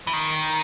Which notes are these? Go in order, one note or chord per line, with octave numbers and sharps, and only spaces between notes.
E3
D#3